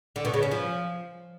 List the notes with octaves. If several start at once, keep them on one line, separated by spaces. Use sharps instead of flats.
D3
B2
C#3
C#4
F3